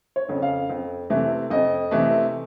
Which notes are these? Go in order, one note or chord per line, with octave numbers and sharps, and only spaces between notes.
C#5
F2 C#3
F5
F2
C3 E3 A3
F2 D#5
C3 E3 A3